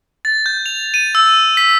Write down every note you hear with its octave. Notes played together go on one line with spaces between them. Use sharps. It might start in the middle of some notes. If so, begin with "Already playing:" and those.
A6
G6
F7
D#7
E6
B6